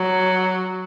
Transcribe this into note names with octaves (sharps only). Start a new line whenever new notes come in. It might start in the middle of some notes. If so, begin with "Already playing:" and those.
Already playing: F#3